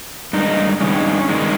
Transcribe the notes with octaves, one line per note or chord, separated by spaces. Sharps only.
G2 D#3 G#3 D#4
G2 D#3 G#3 C#4
G2 D#3 G#3